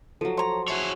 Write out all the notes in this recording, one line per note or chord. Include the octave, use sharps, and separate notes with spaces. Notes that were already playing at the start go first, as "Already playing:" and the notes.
F3 F#3 A4
C5 C#5 A#5 C6
E4 F#4 G#4 C#5 A5